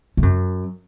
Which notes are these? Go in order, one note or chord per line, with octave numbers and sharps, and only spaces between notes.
G#2
F#2